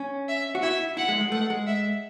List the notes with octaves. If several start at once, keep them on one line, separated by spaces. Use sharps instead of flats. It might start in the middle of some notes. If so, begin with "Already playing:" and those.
Already playing: C#4
E5
F#4
E4 E5
E4 F#5
G#3
G#3
A3 F#5
G#3
E5